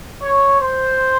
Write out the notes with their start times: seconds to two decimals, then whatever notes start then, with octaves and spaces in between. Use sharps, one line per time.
0.22 C#5
0.61 C5